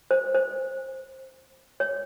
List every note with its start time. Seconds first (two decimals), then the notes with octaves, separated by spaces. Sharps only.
0.11 C5
0.35 C5
1.80 C#5